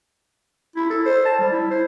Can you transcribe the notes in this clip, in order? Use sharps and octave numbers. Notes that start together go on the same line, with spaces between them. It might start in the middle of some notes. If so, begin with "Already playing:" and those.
E4
A4
C5
A5
G3
E4
C5